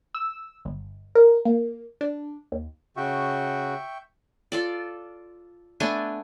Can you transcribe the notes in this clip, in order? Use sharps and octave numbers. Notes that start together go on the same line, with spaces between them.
E6
G1
A#4
A#3
D4
D#2
C#3 F#4 E5 G5 C#6
F4 A4 D5
A3 B3 D4 G#5